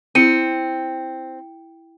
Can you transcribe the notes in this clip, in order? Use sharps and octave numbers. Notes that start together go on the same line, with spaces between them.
C4 E4 C#7 D#7